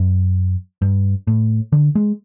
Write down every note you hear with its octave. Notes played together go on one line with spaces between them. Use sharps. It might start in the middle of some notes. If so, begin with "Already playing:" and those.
Already playing: F#2
G2
A2
D3
G#3